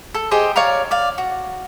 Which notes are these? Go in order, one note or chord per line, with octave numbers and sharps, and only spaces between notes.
A4
G4 G#4 C5 D#5
C#5 D5 F5 A#5
D5 F5
F#4